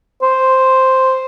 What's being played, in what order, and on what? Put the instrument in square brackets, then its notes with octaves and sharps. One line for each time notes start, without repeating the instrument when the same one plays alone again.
[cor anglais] C5